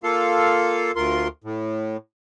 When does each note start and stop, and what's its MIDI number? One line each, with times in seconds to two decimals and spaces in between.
0.03 0.91 58
0.03 0.91 65
0.03 0.91 69
0.03 0.91 77
0.96 1.28 38
0.96 1.28 65
0.96 1.28 70
0.96 1.28 84
1.44 1.97 45